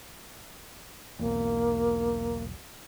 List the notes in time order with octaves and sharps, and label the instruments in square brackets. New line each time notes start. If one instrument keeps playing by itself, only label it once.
[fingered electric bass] E1 B1 [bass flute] A#3